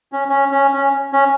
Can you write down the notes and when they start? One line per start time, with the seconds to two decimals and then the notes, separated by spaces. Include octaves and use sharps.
0.12 C#4
0.29 C#4
0.52 C#4
0.73 C#4
1.13 C#4